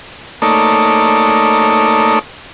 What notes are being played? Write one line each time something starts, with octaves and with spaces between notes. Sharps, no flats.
A3 A#3 D#4 A4 C#5 D5